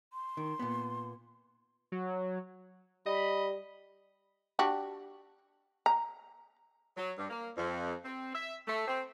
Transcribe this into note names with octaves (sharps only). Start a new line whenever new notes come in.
C6
D#3
A#2 B3
F#3
G3 D#5 B5
D4 F#4 G4
A#5
F#3
G2
A#3
F2
C4
E5
A3
C4